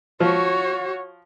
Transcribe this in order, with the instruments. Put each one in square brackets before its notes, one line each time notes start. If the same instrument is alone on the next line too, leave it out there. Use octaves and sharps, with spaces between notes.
[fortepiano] F3 [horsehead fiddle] F#4 C#5